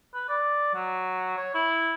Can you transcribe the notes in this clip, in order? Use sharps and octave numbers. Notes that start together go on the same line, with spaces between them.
B4
D5
F#3
C#5
E4